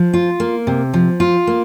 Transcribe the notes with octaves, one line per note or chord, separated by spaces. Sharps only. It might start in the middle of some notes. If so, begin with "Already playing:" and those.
Already playing: F3
F4
A#3
C3
F3
F4
A#3